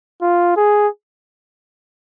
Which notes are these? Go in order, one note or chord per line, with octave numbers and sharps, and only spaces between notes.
F4
G#4